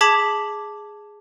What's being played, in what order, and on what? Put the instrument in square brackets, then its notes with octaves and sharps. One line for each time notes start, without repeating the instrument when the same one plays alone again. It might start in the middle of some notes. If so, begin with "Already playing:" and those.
[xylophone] G#4 A5 D6 G#6 B6 F#7